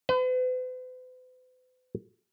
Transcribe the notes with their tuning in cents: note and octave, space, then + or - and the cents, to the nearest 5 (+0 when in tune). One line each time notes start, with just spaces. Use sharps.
B4 +45